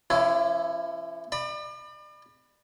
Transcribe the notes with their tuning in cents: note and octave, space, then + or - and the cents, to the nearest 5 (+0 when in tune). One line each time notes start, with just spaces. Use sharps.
F3 -45 C#4 +0 E4 +0
D5 +40 B5 +0